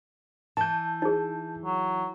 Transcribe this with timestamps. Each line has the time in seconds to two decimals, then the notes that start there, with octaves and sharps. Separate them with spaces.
0.57 E3 A5 G6
1.02 D#4 G#4
1.65 F#3